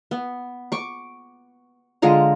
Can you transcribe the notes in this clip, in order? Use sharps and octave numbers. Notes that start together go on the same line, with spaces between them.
B3
C#6 D6
D3 G#3 F4 A#5